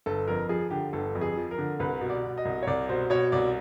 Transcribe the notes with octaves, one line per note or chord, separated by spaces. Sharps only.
G1 A4
F2 A#4
F3 G#4
D3 G4
G1 A4
F2
G#4
F3
A#4
D3
C2 B4
B2
D5
B2
D#5
C2
C#5
C2 D5
B2 C5
B2 C#5
C2 D5